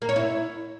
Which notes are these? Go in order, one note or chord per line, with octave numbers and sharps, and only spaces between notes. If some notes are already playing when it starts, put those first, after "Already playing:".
A#3
C#5
E4